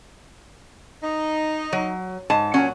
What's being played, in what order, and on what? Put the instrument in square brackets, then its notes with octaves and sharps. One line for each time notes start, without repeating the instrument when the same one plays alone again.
[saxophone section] D#4
[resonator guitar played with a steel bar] F#3
G#2 A5
[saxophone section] A#2 F#3 F#5 [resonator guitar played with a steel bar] C#4